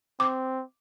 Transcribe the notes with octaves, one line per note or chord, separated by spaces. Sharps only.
C4 D6